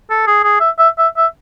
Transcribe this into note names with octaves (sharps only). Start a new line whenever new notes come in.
A4
G#4
G#4
E5
E5
E5
E5